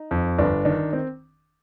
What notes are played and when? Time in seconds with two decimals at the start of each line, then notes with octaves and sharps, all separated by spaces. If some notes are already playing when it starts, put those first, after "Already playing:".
Already playing: D#4
0.11 F2
0.38 G1 D4
0.65 D#3 D4
0.93 C4